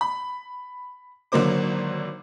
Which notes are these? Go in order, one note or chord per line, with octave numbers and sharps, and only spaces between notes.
B5
G#1 D3 F#3 A#3 C5 D6